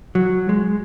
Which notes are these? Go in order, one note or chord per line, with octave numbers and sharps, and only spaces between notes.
F#3
G#3